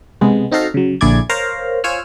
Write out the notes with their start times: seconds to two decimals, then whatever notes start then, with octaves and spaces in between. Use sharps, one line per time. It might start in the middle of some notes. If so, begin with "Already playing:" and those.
0.21 C3 G#3 B3
0.52 C4 D#4 F#4 A4 F5 A#5
0.74 C#3 F#3
1.01 A#1 D3 E4 G#4 D5 G#6
1.30 A#4 C5 C#5 F5 A#5
1.84 F4 C5 C#5 G#5 E6 F6